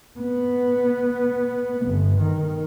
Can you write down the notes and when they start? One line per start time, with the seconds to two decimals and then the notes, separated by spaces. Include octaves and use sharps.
0.19 B3
1.86 G1
2.20 D#3